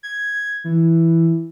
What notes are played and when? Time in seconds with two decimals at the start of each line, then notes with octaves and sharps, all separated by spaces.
0.03 G#6
0.64 E3